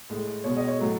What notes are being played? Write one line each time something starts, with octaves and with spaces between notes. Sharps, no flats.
A2 G#3
B2 G#3 C#5
D#5
C#5
A2 F#3 A3